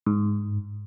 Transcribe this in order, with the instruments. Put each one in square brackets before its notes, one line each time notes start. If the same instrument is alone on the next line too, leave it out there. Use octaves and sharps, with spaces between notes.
[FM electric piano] G#2